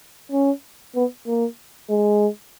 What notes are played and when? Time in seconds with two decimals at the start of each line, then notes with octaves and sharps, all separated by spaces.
0.32 C#4
0.95 B3
1.26 A#3
1.90 G#3